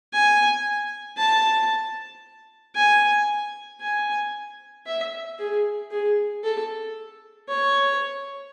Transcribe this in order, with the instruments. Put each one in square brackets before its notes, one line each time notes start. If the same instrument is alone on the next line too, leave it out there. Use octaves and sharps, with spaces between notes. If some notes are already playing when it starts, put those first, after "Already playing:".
[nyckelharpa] G#5
A5
G#5
G#5
E5
G#4
G#4
A4
C#5